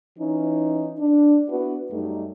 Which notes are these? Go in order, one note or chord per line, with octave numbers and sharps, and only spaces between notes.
E3 C#4 D#4
D4
B3 D4 E4 F#4 B4
F#2 G3 A3 D#4